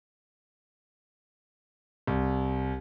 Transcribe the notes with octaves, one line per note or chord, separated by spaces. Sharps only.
C2